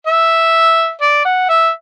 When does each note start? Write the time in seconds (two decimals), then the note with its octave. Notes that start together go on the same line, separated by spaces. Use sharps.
0.07 E5
1.02 D5
1.25 F#5
1.49 E5